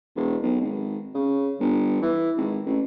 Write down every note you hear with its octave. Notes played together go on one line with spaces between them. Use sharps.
E1
B1
G#1
C#3
G1
E3
G#1
A1